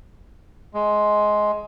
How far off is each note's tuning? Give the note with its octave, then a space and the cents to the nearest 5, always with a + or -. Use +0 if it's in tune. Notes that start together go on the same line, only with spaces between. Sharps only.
G#3 +15